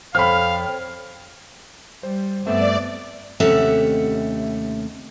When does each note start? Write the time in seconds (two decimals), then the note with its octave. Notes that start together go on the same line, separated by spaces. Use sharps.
0.15 F2 A4 C#5 F5 G5 B5 F6
2.03 G3 C5
2.47 G2 A3 B3 C4 D5 E5
3.40 D#2 C3 A3 C#4 E5 F#5